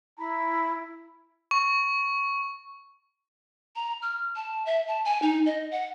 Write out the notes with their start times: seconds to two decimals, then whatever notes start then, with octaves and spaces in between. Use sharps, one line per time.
0.19 E4 A#5 B5
1.51 C#6
3.76 A#5
4.02 F6
4.36 A5
4.66 E5
4.87 A5
5.05 G#5
5.22 D#4
5.46 D#5
5.71 F#5